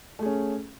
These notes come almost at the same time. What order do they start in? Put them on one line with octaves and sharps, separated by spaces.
A3 G#4 C#4